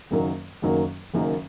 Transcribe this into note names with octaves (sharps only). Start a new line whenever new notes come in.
F#1 F#2 D#3 F#3 A#3
F#1 F#2 D#3 F#3 A#3
F#1 F#2 D#3 F#3 A#3